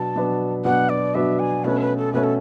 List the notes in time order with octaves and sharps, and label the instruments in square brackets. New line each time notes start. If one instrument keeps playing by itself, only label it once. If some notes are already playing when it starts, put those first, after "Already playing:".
Already playing: [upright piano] B2 F#3 B3 D4 [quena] A5
[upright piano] B2 F#3 B3 D4
[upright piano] B2 F#3 B3 D4 [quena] F#5
[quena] D5
[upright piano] B2 F#3 B3 D4 [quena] E5
[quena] G#5
[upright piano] B2 A3 C#4 [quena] B4
[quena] B4
A4
[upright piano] B2 A3 C#4 [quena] B4
[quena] A4